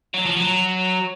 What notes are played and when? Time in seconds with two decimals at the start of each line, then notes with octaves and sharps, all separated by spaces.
0.14 F#3
0.26 F3
0.37 F#3